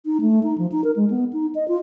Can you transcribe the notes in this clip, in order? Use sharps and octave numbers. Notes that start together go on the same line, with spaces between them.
D#4
A3
D#4
F3
D#4
A#4
G#3
B3
D#4
D#5
F4